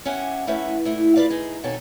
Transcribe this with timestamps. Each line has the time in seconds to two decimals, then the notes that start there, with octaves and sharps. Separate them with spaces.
0.05 C#4 G4 E5 F#5 G#5
0.47 A3 C#4 E4 B4 E5 F#5
0.85 A#2 A3 E4
1.16 F4 B4 D5 F5
1.30 D#4 G#4
1.63 F2 B2 D#3 A4 C#5 G#5